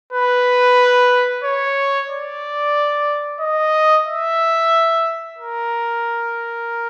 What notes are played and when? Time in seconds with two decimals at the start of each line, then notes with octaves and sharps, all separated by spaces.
0.13 B4
1.44 C#5
2.09 D5
3.40 D#5
4.06 E5
5.38 A#4